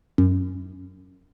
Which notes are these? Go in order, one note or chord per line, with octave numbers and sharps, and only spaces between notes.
F#2